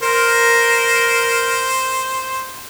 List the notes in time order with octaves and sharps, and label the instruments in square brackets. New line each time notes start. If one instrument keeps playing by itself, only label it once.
[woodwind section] A#4 [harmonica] C5